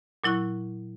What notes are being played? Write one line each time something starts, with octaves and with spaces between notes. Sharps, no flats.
A#2 F#3 E4 C#6 F#6